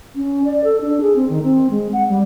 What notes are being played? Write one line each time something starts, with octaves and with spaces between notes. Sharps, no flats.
C#4
D5
A4
D4
G#4
C4
D#3
C4
G#3
F#5
G3